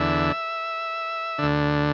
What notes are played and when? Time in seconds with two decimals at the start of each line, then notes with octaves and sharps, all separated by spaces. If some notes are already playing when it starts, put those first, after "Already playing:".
Already playing: E2 D3 E5
1.38 D2 D3